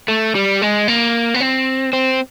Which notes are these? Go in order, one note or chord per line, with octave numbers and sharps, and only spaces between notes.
A3
G3
G#3
A#3
B3
C4
C4